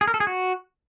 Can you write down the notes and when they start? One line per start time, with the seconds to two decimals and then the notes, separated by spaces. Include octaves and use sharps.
0.01 G#4
0.08 A#4
0.14 A4
0.20 G#4
0.27 F#4